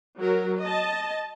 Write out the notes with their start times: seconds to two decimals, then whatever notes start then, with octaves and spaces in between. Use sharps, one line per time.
0.19 F#3 A#4
0.61 D#5 A5